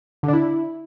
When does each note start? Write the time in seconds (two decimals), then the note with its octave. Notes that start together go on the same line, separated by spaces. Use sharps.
0.23 D3
0.28 D4
0.33 E4